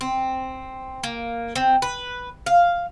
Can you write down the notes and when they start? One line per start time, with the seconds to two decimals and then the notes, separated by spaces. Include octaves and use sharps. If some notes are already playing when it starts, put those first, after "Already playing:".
0.01 C4
1.03 A#3
1.56 C4
1.82 B4
2.46 F5